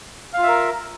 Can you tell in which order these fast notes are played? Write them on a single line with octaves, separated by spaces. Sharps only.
F5 F4 E5 A#4